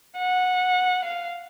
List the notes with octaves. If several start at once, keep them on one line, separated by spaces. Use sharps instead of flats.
F#5
F5